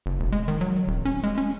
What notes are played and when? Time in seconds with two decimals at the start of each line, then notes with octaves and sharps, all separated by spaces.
0.06 F#1
0.20 E1
0.32 G#3
0.48 D#3
0.61 F#3
0.87 D#1
1.05 C#4
1.23 G#3
1.38 C#4